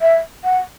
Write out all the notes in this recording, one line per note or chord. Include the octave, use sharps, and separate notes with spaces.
E5
F#5